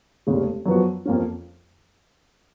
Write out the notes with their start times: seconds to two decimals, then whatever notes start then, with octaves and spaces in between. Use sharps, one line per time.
0.27 F1 D#2 C#3 G#3
0.66 F#2 F3 B3 F#4
1.06 F2 F3 A#3 C#4